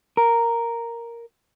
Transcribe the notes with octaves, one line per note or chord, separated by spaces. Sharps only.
A#4